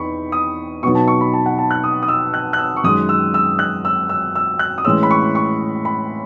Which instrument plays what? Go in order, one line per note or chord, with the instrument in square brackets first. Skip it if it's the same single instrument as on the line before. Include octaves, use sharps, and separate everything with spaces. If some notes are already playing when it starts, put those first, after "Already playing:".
Already playing: [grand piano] E2 D#4 B5 C#6
D#6
B2 F#3 B3 D#4 C#6
A5
C#6
B5
A5
F#5
A5
F#6
D#6
D#6
E6
F#6
F#6
E6
C#6
F#2 D#3 G#3 D#6
E6
E6
F#6
E6
E6
E6
F#6
D#6
A2 E3 G#3 C#4 E6
B5
C#6
C#6
B5